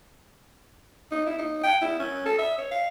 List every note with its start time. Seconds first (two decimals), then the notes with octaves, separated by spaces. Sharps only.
1.11 D#4
1.27 E4
1.38 D#4
1.63 G5
1.82 E4
1.99 C#4
2.26 A4
2.38 E5
2.58 C#5
2.71 F5